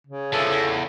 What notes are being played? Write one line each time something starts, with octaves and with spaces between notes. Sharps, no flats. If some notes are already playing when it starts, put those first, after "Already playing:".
C#3
D3 E3 F3 A4
E2